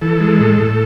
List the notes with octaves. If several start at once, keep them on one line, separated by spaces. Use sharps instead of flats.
E3 A4
G#3
A2
A2